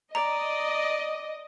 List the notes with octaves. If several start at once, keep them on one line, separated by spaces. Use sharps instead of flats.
D5 D#5 A#5